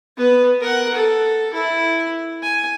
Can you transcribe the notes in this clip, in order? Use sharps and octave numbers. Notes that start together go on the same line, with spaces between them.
B3 B4
A#4 F#5
A4
E4
G#5